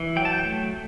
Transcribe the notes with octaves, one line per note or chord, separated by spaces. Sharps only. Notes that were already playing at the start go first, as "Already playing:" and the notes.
Already playing: E3
F#3 G5
A5
G5
A3